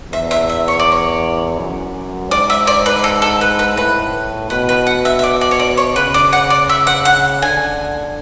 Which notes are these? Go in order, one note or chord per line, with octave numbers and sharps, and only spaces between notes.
E2 E5
E5
E5
C#5
D5
C#5
F#2
G#2 D5
E5
D5
B4
A4
A4
B4
B4
A2 B4
B2 B4
B4
F#5
E5
E5
D5
D5
C#5
D5
C#5
C#3 B4
D5
F#5
D5
E5
F#5
F#5
D3 G#5